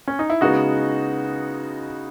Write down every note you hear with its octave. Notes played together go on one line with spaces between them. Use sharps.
C#4
D#4
E4
C#3 G#3 B3 D#4 F#4